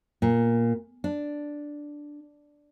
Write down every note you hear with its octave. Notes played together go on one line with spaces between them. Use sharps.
A#2
D4